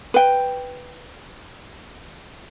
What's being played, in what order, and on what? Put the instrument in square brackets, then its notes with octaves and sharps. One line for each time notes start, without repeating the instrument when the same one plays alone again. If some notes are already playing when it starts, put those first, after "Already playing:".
[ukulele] B4 G5